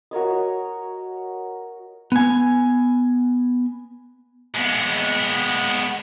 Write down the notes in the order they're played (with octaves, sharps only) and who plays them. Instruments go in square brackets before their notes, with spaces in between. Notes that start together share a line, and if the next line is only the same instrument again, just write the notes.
[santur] F#4 A#4 C#5 D#5
[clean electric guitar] B3 G#5
[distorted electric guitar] G#3 B3